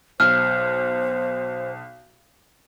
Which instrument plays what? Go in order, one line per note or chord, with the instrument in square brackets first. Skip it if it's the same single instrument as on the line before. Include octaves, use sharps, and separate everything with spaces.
[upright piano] B1 [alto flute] C5 [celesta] F6